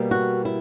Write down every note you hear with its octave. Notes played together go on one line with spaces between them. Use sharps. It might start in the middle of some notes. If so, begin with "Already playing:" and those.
Already playing: B2 G3 A#3
F#4
E4